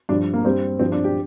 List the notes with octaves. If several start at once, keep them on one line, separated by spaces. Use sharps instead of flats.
G2 F3 D4
A#3
G2 G3 C4
G2 F3 C4
D4
G4